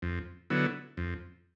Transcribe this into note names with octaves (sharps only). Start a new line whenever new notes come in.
F2
D3 F#3 B3 E4
F2